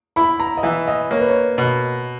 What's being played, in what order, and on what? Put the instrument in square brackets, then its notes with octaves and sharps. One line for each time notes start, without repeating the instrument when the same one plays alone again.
[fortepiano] E4 [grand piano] B5
[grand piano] A#5
D#5
[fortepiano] E3 [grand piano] E5
[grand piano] D#5
[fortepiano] A#3 [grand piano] C#5
[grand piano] B4
C#5
[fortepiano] B2